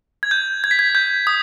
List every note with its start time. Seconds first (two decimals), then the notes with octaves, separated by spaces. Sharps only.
0.23 G#6
0.31 G6
0.64 G#6
0.71 B6
0.79 G#6
0.95 G6
1.27 D#6